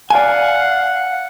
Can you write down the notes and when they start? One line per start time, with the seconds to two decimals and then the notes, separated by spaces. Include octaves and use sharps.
0.10 D5 F5 F#5 G#5